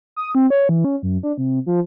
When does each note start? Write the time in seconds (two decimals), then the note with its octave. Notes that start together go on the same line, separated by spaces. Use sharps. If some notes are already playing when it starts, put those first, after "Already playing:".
0.16 D#6
0.35 C4
0.50 C#5
0.69 E3
0.84 C#4
1.03 F#2
1.23 D4
1.37 C3
1.66 F3